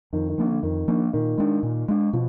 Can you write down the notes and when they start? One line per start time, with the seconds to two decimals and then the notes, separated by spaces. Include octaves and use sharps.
0.13 F2 D#3
0.29 D#3
0.38 F3 A#3 D4
0.47 D3
0.63 F2 D#3
0.88 F3 A#3 D4
1.13 A#2 D#3
1.38 G#3 D4
1.63 A#2
1.88 G#3 D4
2.13 B2 F3